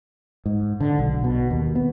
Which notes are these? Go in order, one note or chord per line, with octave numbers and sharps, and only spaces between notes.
G#2
D3
B1
B2
D#2
B3